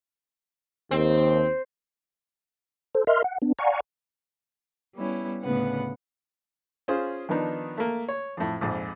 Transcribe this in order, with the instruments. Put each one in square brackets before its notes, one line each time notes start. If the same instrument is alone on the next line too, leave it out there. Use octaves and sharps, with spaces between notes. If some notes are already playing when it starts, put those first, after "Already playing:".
[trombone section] D#2 [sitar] C4
[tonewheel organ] A4 C5
A#4 D#5 E5 C6 F6
F#5
B3 D4
D5 F5 F#5 G#5 A#5 C#6
[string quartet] G3 B3 C#4 E4
D2 A2 C#3 B3 B4 F#5
[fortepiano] C#4 F4 G#4 C5
D#3 F3 B3 D4 D#4
A3 A#3
C#5
F2 A2
A#1 F2 G#2